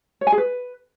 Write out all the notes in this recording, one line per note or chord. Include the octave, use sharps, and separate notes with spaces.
C#5
G#5
G#4
B4